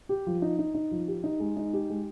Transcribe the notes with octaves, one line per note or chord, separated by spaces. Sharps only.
G4
F3
D#4
D#4
D#4
F3
G4
D#4
G#3
D#4
G4
G#3